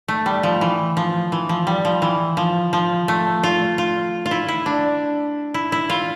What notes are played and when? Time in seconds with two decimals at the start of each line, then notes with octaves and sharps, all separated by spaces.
0.08 A3
0.26 G3
0.43 F3
0.61 E3
0.97 F3
1.32 E3
1.49 F3
1.67 G3
1.85 F3
2.02 E3
2.37 F3
2.73 F3
3.08 A3
3.43 F4
3.78 F4
4.26 F4
4.31 E4
4.48 E4
4.66 D4
5.54 E4
5.72 E4
5.90 F4